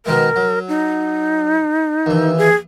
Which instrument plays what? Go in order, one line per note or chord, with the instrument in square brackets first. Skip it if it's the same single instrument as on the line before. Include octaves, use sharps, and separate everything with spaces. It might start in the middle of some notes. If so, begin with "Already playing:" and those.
[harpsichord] B2 D#3 G#3 [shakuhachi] A#4
[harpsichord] F#3
[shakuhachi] D#4
[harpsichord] D#2 E3
[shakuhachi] G#4